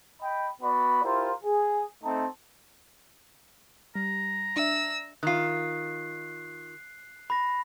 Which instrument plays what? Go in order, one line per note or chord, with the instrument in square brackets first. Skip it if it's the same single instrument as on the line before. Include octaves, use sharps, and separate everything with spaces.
[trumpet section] D#5 G5 B5
B3 F#4 D5 B5
E4 F4 G4 A#4 C5
G#4
A3 C4 D#4 A5
[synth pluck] G3 [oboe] A#5
[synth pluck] D4 E5 [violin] E6
[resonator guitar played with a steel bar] D#3 F4 [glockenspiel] F#6 C7
[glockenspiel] B5 A#6